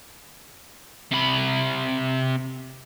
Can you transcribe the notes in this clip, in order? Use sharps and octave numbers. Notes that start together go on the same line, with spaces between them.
C3 B5